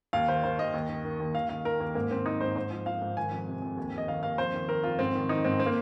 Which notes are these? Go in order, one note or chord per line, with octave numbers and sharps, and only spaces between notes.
D#2 F5
D#3 C5
D#3 C5
D#2 D#5
D#2
D#3
D#3
D#2
D#2 F5
D#3 F5
D#3 A#4
D#2 A#3
G#2 A#3
D#3 C4
D#3 D#4
G#2 C5
G#2 C5
F3
F3 F5
G#2
D#3 G#5
F2
C3
F2
D#2
D#3
D#5
D#3 F5
D#2 F5
F2 C5
D#3
D#3 A#4
F2 F4
G#2 C4
D#3
D#3 D#4
G#2 C4
C4
A#3